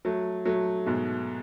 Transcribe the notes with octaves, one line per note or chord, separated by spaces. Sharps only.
F#3 A3
F#3 A3
G#2 B2